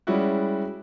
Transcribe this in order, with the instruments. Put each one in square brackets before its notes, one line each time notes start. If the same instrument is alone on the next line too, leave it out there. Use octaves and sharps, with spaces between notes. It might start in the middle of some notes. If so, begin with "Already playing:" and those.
[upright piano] G3 G#3 C#4 E4 F#4